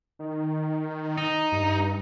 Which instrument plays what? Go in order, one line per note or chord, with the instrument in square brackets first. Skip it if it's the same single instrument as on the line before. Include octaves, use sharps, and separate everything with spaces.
[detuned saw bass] D#3
[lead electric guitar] D#4
[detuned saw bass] G2